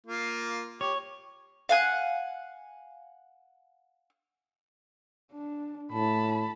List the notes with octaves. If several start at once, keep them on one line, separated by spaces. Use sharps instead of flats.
A#3 F4
G4 C#5
F5 F#5 G#5 F#6
D4
A2 A5 B5